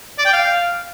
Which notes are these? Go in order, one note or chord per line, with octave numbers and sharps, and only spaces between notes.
D5
G5
F5